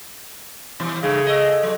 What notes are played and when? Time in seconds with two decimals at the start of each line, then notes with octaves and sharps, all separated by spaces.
0.80 B2 E3 G3
1.03 G2 C#3 A3
1.26 A4 D#5
1.63 F#3 F#4